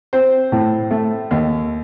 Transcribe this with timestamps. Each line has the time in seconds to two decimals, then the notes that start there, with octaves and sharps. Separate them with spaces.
0.13 C4 C5
0.52 A2
0.91 A3
1.31 D#2